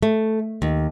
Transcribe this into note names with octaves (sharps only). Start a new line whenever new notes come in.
A3
D#2